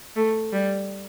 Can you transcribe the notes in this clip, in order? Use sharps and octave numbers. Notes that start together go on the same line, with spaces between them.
A3
G3